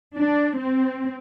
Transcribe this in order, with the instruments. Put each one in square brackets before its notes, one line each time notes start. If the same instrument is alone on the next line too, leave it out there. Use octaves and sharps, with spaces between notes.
[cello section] D4
C4